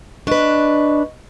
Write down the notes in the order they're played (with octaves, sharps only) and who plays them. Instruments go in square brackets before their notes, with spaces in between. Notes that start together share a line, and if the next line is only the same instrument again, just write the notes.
[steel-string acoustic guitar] D4 B4 [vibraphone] D#5 C#6